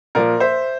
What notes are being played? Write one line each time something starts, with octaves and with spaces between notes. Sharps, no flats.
A#2 F3 A#4 D5
C5 E5